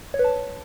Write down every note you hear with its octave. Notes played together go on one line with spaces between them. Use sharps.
C#5
B4
A5